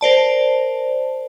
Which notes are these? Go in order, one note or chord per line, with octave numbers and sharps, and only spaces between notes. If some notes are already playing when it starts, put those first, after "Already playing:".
A#4 C5 D5 A5